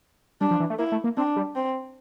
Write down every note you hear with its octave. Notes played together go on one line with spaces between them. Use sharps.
G3 D4
F3
E3
A3
A#3 E4
A3
A#3
C4 D4
G3
C4